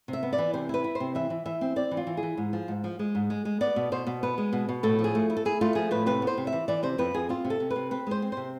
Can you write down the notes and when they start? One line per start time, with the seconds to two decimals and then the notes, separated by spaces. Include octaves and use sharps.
0.08 C3
0.13 E5
0.23 B3
0.33 D5
0.38 E3
0.54 C3 C5
0.69 E4 B4
0.84 E4
0.95 C5
1.00 C3
1.15 E3 E5
1.30 E3
1.46 E3 E5
1.61 C4
1.76 C4 D5
1.91 E3
1.97 F4
2.07 E3
2.17 G#4
2.23 E3
2.37 G#2
2.53 F3
2.68 G#2
2.84 F3
2.99 G#3
3.15 G#2
3.30 G#3
3.45 G#3
3.61 B3 D5
3.76 B2
3.92 B2 C5
4.07 B2
4.23 B3 B4
4.38 G#3
4.53 B2
4.69 B2
4.83 A2 A4
4.99 F3
5.04 G#4
5.15 A3
5.30 E4
5.37 A4
5.45 E4 G#4
5.61 A3 F4
5.75 F3 G#4
5.91 A2 B4
6.06 C3 B4
6.22 B3
6.27 C5
6.37 C3
6.47 E5
6.53 E3
6.68 E3 D5
6.83 C3 C5
6.98 F2 B4
7.14 F2 G#4
7.29 C4 F4
7.45 C3
7.50 A4
7.60 C3
7.70 B4
7.76 C3
7.91 C4 B4
8.07 G#3 C5
8.22 C4
8.32 C3 C5